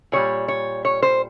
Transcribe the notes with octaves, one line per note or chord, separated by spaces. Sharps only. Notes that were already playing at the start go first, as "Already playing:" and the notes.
A#2 G3 C#5
C#5
C#5
C5